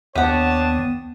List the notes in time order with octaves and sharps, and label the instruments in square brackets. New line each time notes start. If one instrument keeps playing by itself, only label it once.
[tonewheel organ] D#2 D#6 [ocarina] B3 [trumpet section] D4 C#5 A5 [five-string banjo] G4 F#5